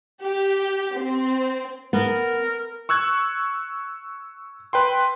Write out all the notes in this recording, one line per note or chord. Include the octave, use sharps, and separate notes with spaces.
G4
C4
B3 A#4
C#6 E6 F#6 G#6
B4 G5 C6